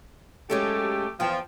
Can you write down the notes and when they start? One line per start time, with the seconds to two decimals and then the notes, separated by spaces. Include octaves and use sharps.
0.50 F#3 G#3 A3 C#4 G4 A4
1.20 E2 F3 G5